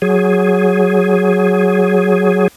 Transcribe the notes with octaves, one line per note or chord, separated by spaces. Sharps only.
F#3 G#4